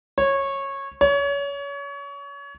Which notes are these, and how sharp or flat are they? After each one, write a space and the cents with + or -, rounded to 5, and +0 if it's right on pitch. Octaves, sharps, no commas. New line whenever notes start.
C#5 -15
C#5 +30